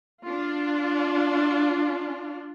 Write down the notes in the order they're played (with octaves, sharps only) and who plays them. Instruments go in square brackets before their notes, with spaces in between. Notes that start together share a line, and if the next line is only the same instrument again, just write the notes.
[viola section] D4 F4